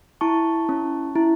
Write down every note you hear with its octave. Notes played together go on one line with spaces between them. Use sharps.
E4 A5 C#6
C#4
E4